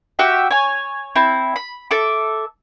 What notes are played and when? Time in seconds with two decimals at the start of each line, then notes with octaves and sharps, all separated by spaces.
0.19 F#4 G4 E5 G5
0.51 C#5 G#5
1.16 C4 E4
1.56 B5
1.91 A4 E5 D6